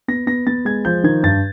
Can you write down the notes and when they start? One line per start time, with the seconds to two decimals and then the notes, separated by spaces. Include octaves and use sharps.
0.08 B3 A#6
0.27 B3 A#6
0.47 B3 A6
0.65 G#3 G#6
0.85 F3 G6
1.04 D#3 G#6
1.23 G2 A6